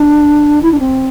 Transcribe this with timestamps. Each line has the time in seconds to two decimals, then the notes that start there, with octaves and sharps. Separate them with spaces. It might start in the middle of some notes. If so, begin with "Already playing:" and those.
Already playing: D4
0.62 E4
0.72 D4
0.79 C4